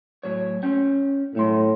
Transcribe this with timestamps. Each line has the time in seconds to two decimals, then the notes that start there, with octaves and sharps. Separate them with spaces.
0.23 A2 F#3 C#5
0.63 C#4 G5
1.35 B1 A2 A3 C6